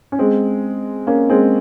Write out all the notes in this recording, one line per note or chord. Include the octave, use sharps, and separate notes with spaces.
C#4
G#3 C4
A#3 C#4
G#3 C4